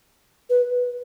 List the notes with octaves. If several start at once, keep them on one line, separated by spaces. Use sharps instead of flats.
B4